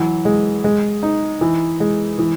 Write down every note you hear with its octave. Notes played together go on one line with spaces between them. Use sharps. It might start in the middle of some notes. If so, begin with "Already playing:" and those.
Already playing: E3 F#3
G#3
G#3
D#4
E3
G#3
E3